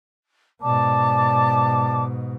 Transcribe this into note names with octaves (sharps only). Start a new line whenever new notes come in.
G#2 B2 D5 A5 D6